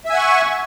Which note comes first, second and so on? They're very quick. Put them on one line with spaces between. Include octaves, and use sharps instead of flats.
E5 G#5 F#5 C#6